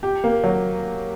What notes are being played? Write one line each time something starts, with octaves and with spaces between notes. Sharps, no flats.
G4
A#3
F#3